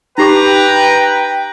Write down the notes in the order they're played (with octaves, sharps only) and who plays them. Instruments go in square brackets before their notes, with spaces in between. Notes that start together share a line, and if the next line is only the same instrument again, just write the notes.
[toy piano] D#4 G4 D6 [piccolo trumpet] B4 [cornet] G5 [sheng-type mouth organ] A#5